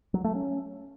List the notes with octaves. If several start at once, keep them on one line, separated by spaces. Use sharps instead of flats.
F#3
A3
C#4